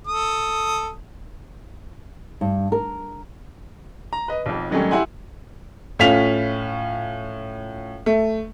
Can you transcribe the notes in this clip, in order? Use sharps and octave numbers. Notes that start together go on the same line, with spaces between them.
A4 D#6
G2
A#4
A#5
B4 D#5
B1 F2
G#2 D#3 F#3 G3 A3 C#4
E4 G4 F#5 G#5 C6
A2 C#4 F4 B6 F7
A3